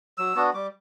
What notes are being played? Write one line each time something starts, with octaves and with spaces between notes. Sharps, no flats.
F#3 E6
B3 D4 F#4
G3 D6